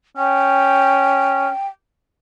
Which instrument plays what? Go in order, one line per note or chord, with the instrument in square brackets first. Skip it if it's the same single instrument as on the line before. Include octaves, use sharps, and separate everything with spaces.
[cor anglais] C#4 [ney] G5